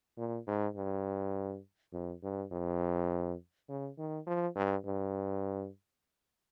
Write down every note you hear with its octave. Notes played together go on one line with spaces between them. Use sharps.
A#2
G#2
G2
F2
G2
F2
C#3
D#3
F3
G2
G2